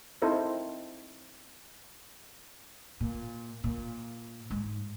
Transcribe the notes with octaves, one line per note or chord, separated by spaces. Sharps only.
C4 D#4 E4 A4 A#4 C5
A#2
A#2
G#2